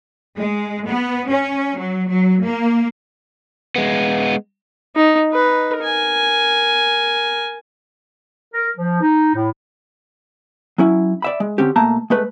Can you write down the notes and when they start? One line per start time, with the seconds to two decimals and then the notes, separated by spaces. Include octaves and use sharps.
0.38 G#3
0.87 B3
1.28 C#4
1.76 F#3
2.10 F#3
2.43 A#3
3.76 G#3 B3
4.96 D#4
5.31 D#4 B4
5.79 A#4 G#5
8.53 A#4
8.77 F3
9.01 D#4
9.35 A2
10.78 F#3 C#4 E4
11.22 D5 E5 B5
11.40 G#3
11.58 D3 C4 C#4 G4
11.76 B2 A3 A#3 A5 A#5
12.10 G#3 A3 B4